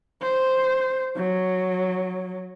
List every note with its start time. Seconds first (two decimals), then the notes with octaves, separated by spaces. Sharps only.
0.22 C5
1.16 F#3